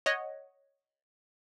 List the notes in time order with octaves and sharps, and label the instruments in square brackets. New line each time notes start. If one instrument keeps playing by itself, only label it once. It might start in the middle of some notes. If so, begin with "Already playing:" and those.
[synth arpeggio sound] C#5 D#5 F#5